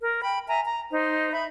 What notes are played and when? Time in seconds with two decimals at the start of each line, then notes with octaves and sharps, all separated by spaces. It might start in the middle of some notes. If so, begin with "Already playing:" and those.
0.01 A#4
0.22 G5 B5
0.47 E5 G#5 A#5
0.64 A#5
0.92 D#4 C5
1.31 E5 B5